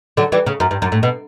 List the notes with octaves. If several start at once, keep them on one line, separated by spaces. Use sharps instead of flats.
D3 F#3
E3 G3
C#3
F#2
G2
F#2
A2
B2